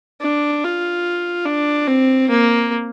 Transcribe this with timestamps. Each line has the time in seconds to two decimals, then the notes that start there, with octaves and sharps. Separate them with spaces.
0.22 D4
0.63 F4
1.46 D4
1.87 C4
2.29 A#3